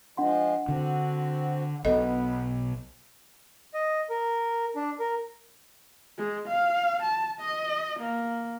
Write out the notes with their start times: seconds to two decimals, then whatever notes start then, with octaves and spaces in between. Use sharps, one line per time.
0.17 F3 G#3 D4 F#5 C6
0.68 D3 C4 F#4
1.85 B1 B2 B3 A4 D#5
3.74 D#5
4.09 A#4
4.76 D4
4.99 A#4
6.18 G#3
6.48 F5
7.02 A5
7.40 D#5
7.99 A#3